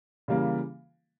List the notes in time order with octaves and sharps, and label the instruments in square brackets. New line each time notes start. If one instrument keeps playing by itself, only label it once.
[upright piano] C#3 E3 G3 A#3